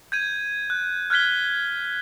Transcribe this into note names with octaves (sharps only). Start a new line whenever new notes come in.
G6 G#6 D#7
F#6
F6 F#6 G#6 B6 G7